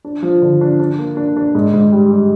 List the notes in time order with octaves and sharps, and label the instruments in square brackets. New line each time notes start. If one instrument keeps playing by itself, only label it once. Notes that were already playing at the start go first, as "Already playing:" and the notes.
[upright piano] D4
F3
D3
D4
D4
A#3
D4
D4
G#2
G#2
G3
G3